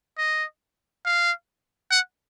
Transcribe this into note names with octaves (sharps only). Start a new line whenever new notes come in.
D#5
F5
F#5